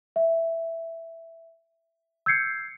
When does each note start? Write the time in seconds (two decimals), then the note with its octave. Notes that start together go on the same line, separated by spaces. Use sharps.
0.16 E5
2.26 E6 G6 G#6 C7 C#7